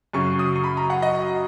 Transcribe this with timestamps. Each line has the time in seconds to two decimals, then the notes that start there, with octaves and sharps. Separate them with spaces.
0.13 F#2 C#3 F#3 C#6
0.39 D#6
0.56 C#6
0.64 B5
0.77 A#5
0.90 F#5
1.02 D#5